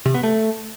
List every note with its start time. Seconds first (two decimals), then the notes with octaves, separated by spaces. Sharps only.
0.06 C3
0.14 B3
0.23 A3